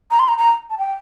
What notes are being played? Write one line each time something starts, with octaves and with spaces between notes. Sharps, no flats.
A#5
C6
A#5
A#5
A5
G5